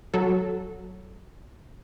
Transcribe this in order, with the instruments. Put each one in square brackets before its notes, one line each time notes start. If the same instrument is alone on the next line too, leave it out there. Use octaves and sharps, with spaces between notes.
[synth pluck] F#3 A4